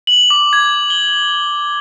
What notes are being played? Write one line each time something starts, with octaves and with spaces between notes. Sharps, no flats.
F#7
D6
G#6
G7